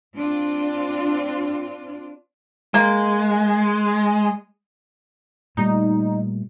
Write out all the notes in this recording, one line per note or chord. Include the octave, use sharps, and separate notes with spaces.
C4 D4 F4
G#3 A#3
A#2 G3 A3 D#4